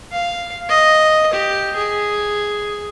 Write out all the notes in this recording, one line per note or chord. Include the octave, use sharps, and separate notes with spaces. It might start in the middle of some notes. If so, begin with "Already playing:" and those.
F5
D#5
G4
G#4